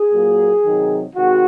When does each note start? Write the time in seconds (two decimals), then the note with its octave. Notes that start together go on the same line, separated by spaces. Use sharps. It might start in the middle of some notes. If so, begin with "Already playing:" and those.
Already playing: G#4
0.12 A#2 F#3 A#3
0.64 C3 D#3 F#3
1.15 C3 D#3 G#3 F#4